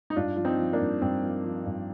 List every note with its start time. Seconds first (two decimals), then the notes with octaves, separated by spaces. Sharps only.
0.10 D#4
0.16 G2 D4 F4
0.36 F3 F4
0.45 C4 D#4
0.59 F3
0.73 A#3 D4
0.81 G2
1.02 G2 C4
1.23 F3
1.44 F3
1.66 G2